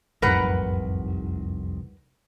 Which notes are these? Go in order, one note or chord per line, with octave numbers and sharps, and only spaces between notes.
F1 C2 F#2 A2 D#4 A#4 B4 F#5